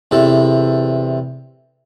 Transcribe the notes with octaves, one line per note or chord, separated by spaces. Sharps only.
E2 C3 A4